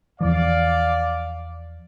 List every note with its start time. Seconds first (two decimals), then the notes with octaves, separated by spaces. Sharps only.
0.21 E2 E3 F3 D5 F5